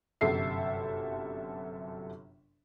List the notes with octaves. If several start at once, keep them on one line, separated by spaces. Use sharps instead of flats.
G1 F#2 C3 A4 E5 C7